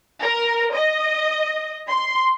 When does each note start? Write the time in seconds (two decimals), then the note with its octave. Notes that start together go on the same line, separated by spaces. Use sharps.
0.21 A#4
0.74 D#5
1.88 C6